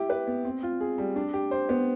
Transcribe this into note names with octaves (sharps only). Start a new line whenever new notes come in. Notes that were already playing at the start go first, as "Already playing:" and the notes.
Already playing: E4 G4
B4
B3
C4
F4
G#4
G3
D4
G4
C5
B3